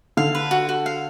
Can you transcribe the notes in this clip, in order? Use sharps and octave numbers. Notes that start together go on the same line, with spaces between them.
D3 F5
B4
F#4
F#4
F5